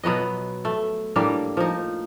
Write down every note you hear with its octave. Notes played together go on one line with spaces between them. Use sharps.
B2 F#3 B3 D#5
A3
A2 G3 A#3 D4
F3 D#4